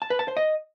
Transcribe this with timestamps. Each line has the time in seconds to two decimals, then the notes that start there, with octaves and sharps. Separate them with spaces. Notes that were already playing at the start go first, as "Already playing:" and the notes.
0.02 A5
0.10 B4
0.19 A5
0.28 C5
0.37 D#5